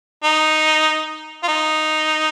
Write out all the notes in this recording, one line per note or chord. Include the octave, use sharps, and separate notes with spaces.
D#4
F4
D#4